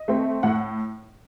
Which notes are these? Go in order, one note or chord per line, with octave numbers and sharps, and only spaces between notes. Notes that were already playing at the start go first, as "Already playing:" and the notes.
Already playing: D#5
A3 C4
A2 F#5